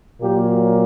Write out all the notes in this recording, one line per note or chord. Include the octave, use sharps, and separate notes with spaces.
A#2 F#3 A#3 G4